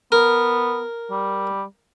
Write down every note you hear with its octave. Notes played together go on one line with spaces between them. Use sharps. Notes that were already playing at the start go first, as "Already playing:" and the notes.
B3 A#4
G3